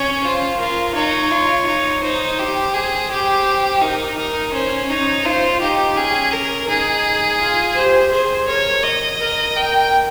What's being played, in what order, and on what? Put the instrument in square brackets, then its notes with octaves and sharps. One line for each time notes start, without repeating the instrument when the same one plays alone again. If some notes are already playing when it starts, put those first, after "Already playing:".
Already playing: [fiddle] C#4 [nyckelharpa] C#5
[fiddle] F4 [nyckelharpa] C5
[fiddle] F4 [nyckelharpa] A#4
[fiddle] D#4 [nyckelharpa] C#5
[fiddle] F4
D#4
[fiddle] D#4 [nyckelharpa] C5
[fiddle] G4
[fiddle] G#4 [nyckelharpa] C5
[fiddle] G4
[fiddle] D#4 [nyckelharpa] A#4
[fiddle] D#4 [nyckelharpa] A#4
[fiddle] C#4 [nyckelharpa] C5
[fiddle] D#4 [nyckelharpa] C#5
[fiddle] F4 [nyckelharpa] C5
[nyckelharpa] D#4 [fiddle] G4
[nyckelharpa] C#4 [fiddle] G#4
[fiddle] A#4
[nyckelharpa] D#4 [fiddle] G#4
[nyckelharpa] F4
[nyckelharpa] G4 [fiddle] C5
[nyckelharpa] G#4 [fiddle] C5
[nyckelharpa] A#4 [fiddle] C#5
[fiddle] D#5
[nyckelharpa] A#4
[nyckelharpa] A#4 [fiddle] G5